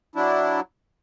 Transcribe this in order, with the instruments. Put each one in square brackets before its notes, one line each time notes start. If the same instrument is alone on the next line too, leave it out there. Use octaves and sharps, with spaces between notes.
[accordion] F#3 D4 E4